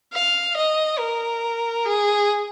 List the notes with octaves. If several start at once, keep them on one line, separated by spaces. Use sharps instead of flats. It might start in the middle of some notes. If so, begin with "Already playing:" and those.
F5
D#5
A#4
G#4